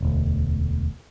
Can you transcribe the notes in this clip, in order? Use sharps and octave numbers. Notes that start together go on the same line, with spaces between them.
E1 D2